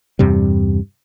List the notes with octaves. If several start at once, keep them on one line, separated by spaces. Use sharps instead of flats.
E2 G2 C3 G3